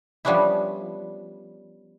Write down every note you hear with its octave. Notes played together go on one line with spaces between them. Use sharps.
F3 G3 B3 C#4 D4 E4